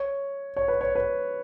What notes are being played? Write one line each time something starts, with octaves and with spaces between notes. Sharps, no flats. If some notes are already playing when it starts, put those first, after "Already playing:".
Already playing: C#5
C#5
B4
C#5
B4